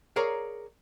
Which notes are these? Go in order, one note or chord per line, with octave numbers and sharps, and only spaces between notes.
G#4 A#4 C#5 D5 F5 A#5